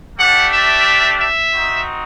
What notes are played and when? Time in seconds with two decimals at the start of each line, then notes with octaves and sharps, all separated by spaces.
0.17 A3 D4 G4 F#5
0.52 E5
1.20 E5
1.54 C4 D#4 F#4